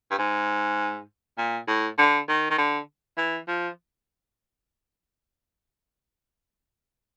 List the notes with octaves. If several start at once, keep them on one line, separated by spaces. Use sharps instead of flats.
G2
G#2
A#2
A2
D3
D#3
D#3
D3
E3
F3